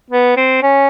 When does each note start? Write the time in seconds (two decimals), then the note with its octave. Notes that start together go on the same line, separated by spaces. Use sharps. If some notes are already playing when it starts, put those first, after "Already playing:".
0.10 B3
0.37 C4
0.63 C#4